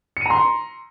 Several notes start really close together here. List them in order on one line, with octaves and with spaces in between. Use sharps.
C#7 D#7 A#5 C6